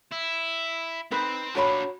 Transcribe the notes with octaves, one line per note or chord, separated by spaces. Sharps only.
E4
C4 D#4 B4 C6
D4 F4 F#4 C#5 B5